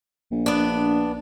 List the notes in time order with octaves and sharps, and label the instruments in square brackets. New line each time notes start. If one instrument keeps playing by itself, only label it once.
[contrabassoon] A#1
[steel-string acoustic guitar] B3 D4